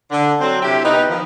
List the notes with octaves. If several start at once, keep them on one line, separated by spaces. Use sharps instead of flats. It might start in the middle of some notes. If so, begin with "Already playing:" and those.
D3
F#3 C4
C3 E4 G4
B3 D#4
D#3 F3